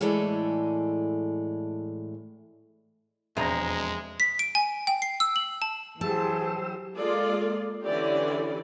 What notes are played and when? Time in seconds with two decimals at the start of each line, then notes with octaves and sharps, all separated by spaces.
0.01 A2 E3 G#3 A4 D5 G#5
3.37 E1 F2 G#3 C5 E5 A#5 A#6
4.20 B6
4.39 D7
4.55 G#5
4.87 G5
5.02 C7
5.20 E6
5.36 F#7
5.62 A5
6.01 E3 F#3 G4 G#4 C5 A5 E6
6.98 G#3 A#3 F4 A4 D5
7.86 D3 E3 C#4 E4 G4 D5